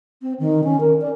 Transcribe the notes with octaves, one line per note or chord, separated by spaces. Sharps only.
C4
D#3
C#4
A#4
D5